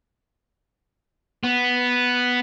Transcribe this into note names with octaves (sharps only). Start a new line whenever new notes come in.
B3